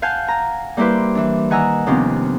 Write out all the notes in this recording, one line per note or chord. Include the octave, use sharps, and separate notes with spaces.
F5 F#5 G#5 A5 G6
G#5 A#5
G3 A#3 E4 G4 B4 C5
E3 D4
D#3 F#5 G#5 A#5 E6
D#2 C3 D#3 F3 B3 C#4